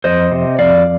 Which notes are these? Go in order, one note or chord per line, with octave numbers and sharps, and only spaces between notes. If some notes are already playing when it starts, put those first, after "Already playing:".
F2 C5 D#5
C3
F2 D5 F5